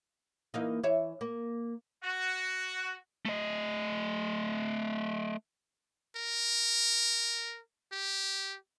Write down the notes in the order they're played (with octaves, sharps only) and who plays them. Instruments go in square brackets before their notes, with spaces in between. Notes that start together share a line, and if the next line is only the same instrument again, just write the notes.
[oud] E3 A#3 D#4
E3 C#5 E5
A#3
[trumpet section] F#4
[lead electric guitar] A3 D#5
[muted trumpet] A#4
G4